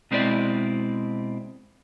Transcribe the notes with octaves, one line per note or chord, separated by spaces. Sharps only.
B2 G#3 C4 E4 D5